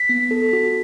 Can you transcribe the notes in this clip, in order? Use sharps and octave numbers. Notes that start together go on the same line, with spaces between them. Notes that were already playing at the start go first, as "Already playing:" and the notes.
Already playing: B6
B3
A4
F#4